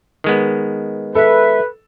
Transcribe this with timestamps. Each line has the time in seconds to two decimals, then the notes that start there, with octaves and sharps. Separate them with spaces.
0.24 D#3 G#3 B3
1.15 A4 B4 E5